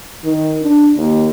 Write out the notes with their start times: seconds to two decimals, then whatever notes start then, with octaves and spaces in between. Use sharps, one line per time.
0.25 D#3
0.62 D4
0.97 D#2